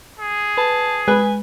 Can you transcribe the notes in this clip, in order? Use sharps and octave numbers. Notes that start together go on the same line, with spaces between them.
G#4
B4 A5
G#3 B4 G#5